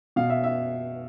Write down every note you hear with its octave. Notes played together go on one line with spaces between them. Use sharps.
B2 F5
E5
E5